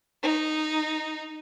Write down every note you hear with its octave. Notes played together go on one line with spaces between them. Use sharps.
D#4